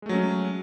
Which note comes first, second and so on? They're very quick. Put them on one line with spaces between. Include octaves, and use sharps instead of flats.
G#3 A3 F#3 C#4